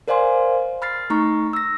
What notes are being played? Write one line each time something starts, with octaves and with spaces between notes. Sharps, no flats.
A#4 C5 D5 F5 G#5 C6
B5 F6 A6 C7
A3 D#4 A#5 C#6
E6 A#6